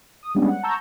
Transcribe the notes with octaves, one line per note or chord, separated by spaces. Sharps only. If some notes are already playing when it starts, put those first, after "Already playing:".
D#6
G3 G#3 B3 C#4 D4
F#5
A5 A#5 C#6 E6 G6